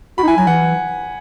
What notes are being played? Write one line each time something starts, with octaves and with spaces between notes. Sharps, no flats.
F#4 B5
D#4
E4 G#5
F#3 G#5
E3 F#5